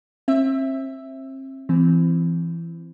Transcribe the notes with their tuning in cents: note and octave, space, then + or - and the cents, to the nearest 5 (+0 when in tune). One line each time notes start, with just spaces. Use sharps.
C4 +35 E5 +0
E3 +25 C4 -15